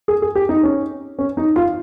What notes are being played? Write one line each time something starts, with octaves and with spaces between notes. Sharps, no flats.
G#4
G#4
G4
D#4
C#4
C#4
D#4
F4